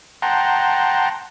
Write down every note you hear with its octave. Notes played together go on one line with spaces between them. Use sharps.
F#5 G5 A5 A#5 C6